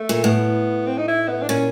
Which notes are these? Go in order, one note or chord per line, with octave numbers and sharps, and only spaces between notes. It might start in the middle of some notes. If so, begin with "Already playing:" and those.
Already playing: A3
A#2
A2 B3
C4
D#4
E4
B3
D4
A#2 C#4